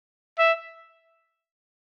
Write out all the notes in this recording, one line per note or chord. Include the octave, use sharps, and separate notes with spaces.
E5